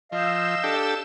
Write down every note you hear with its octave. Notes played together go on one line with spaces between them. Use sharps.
F3 D#5 F5 E6 G6 E7
D4 G4 A4